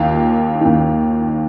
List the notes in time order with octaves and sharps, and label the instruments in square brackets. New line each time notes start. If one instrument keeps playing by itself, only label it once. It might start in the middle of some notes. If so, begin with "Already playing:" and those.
Already playing: [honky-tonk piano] D#2 D#3 F4
D#2 D#3